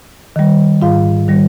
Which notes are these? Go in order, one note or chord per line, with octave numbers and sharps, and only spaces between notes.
D#3 G3
G#2 F4 F5
D#3 G3